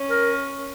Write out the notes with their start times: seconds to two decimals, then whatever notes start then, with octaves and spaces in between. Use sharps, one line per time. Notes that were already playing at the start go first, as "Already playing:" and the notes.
Already playing: C#4
0.10 A#4